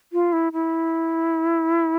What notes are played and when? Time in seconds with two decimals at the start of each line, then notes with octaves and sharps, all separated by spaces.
0.13 F4
0.33 E4
0.53 E4